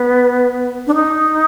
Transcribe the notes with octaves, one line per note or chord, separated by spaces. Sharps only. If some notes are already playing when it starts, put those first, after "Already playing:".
Already playing: B3
D4
D#4